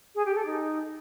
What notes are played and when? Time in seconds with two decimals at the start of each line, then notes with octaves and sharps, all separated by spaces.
0.15 G#4
0.25 G4
0.35 A4
0.45 D#4